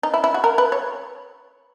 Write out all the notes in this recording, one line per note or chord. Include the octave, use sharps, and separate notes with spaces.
D#4
E4
E4
F#4
A#4
B4
C#5